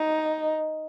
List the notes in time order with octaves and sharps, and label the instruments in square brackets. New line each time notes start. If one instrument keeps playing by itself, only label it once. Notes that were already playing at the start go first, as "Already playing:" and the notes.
Already playing: [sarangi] D#4